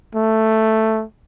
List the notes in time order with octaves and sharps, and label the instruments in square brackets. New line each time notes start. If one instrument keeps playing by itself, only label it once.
[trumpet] A3